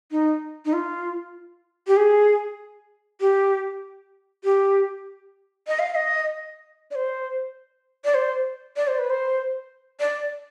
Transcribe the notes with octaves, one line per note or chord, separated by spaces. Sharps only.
D#4
D#4
F4
G4
G#4
G4
G4
D#5
F5
F5
D#5
D5
C5
D5
C5
D5
C5
B4
C5
D5